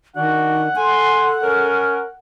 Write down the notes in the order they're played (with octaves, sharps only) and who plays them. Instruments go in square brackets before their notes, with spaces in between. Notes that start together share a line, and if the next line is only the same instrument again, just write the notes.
[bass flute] D#3 [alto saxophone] D4 [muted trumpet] F#4 [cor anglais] F#5
[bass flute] A4 [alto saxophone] G#5 [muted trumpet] C6
[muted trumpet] C#4 [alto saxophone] A#4